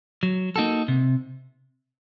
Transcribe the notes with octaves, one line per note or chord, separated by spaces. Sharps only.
F#3
A#3 D#4 F#4 A4
C3